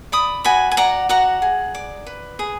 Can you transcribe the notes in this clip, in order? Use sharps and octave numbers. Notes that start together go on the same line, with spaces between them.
D5 B5 D#6
F#4 G#5 B5
G#5
D5 F#5 A#5
F#4 F#5 A#5
G#4
D5
B4
G#4